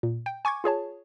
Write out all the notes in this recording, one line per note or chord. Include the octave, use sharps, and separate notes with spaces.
A#2
G5
G#5 C#6 D6 G#6
F4 G#4 C#5 A5